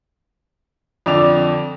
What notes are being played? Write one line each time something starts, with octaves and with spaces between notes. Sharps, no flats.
F2 D3 D5 D6 F7